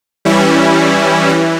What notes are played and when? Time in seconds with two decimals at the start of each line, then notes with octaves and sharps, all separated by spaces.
0.25 E3 G3 C#4 E4
1.29 E3